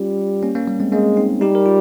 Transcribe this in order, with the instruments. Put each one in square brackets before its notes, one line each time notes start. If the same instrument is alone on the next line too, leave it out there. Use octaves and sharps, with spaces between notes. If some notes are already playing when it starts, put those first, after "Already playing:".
Already playing: [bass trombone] G3 [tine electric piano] C#4 F4
[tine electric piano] A#3 C#4
A#3 C#4
G3 A#3
G#3 C4
[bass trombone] G#3 [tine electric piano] A#3 C#4
[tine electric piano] C4 D#4
[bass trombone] G3 [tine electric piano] D#4 G4
[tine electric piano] A#4
F4